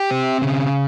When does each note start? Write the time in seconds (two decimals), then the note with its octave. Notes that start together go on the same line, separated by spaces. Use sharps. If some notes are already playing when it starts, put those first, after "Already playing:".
Already playing: G4
0.11 C4
0.42 C#3